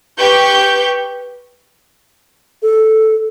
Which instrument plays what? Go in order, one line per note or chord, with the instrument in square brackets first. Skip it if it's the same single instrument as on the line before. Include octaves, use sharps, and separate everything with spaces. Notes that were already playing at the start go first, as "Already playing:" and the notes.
[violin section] G4 B4 C#6 G6
[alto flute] A4